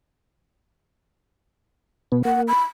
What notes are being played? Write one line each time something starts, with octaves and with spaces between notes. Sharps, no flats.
B2 B3
A#3 F#5
B5